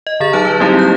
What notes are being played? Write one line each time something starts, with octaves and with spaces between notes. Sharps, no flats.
D#5
D3 G#4 A6
F#3 D#4 A5 F6
B4
G3 A#3 C4 D#4 E4 G4
G6